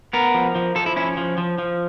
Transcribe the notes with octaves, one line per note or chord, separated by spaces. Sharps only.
B3 A#4
F3
F3
F3 A4
E4
C#4 E4
F3
F3
F3